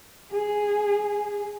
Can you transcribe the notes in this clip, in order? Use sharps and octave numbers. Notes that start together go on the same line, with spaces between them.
G#4